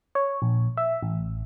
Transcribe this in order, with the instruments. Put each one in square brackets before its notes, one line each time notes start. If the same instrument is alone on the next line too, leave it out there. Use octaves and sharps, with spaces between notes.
[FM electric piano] C#5
A#1
E5
A1